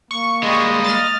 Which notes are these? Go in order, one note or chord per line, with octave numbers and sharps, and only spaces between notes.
A#3 C#6
G3 G#3 D#5
F6 A6